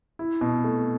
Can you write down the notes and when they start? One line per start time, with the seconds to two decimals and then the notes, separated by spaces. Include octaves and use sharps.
0.19 E4
0.41 B2
0.64 A3